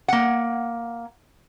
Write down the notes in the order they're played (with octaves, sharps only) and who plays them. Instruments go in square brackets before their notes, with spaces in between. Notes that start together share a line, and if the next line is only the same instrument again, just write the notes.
[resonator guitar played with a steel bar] A#3 F#5